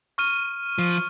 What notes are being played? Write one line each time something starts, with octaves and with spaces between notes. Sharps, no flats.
C#6 F6 D#7
F3